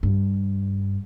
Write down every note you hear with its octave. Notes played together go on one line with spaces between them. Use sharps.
G2